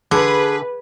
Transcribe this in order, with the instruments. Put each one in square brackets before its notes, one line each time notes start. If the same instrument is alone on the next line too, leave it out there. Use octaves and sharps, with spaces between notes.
[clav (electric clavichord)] D3 [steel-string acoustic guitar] G#4 [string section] B4